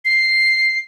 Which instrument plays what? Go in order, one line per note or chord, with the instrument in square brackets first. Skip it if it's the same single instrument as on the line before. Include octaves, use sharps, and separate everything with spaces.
[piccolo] C7